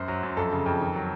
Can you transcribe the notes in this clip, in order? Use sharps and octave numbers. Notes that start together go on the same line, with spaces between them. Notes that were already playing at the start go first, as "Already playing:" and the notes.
Already playing: F#2 C5
F#3
F#2
F2 A4
C#3
F2
D#3
F#3